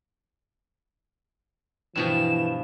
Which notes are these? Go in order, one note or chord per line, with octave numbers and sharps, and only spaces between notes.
G2 B2 E3 F3 E7